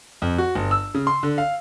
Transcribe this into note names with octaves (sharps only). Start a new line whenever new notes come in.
F2
F#4
G1
E6
C#3
C6
D3
F5